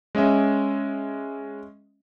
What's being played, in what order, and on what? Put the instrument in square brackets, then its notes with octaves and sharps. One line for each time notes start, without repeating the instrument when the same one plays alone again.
[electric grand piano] G#3 C#4 D#5 E5